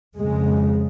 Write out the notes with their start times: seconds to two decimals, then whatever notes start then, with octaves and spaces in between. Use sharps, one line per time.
0.17 F2 C#3 G#3